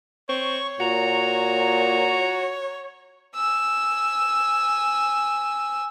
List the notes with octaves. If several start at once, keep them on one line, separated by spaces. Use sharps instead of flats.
C4 C#5 C#6
A#2 F#4 A#5
G#5 E6